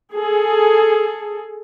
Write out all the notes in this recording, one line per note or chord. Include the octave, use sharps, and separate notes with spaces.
G#4 A4